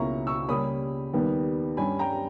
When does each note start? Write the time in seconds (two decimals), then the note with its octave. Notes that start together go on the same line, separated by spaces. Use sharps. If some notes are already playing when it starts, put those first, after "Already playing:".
Already playing: C#2 B2 A#3 C#4 E4 A#5 C#6
0.27 C#6 E6
0.48 C#3 G3 A#3 C#4 B5 D#6
1.13 D#2 D#3 G3 B3
1.77 G2 G3 C#4 G#5 B5
1.99 G5 A#5